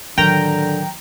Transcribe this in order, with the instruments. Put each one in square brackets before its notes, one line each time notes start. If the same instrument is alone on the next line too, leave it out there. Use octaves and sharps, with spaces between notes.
[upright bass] A2 F#3 [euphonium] D3 [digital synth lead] D#3 [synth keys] G5 A#5